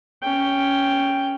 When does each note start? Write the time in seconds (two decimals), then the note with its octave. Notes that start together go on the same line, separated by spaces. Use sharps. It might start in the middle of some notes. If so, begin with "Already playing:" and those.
0.22 C#4 G5